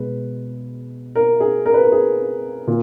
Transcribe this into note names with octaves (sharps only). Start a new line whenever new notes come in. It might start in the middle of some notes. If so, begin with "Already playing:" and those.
Already playing: B2 G#3 B4
A#4
G#4
A#4
B4
A#4
G#4
A#2